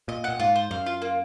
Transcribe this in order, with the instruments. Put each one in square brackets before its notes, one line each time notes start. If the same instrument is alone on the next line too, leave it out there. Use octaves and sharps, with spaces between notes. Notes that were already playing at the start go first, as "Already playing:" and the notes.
[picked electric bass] A#2 [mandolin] D#5
[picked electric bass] A#2 [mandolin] F#5
[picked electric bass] G#2 [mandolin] F4
[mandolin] C5
[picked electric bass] F#2 [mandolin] F5
[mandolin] F4
A#3